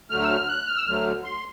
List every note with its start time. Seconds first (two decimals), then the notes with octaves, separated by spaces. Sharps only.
0.10 D2 D3 F#3 A3 F6
0.21 E6
0.28 F6
0.48 F#6
0.67 F6
0.76 E6
0.86 D2 D3 F#3 A3 F6
1.24 C6